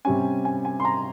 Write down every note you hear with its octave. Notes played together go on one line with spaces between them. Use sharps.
C3 G3 C#4 G#5
G#5
G#5
C6
A#5